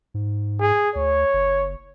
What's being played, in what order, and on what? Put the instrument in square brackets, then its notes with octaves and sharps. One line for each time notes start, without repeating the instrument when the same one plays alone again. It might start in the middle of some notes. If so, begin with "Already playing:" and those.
[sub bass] G#2
[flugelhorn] G#4
[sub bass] D2 [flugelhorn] C#5
[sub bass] F#1